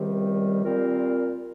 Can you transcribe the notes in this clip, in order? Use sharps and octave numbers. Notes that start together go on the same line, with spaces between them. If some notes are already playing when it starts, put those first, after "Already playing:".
Already playing: C#2 C3 D#3 G3
A#2 G3 C4 F4 A#4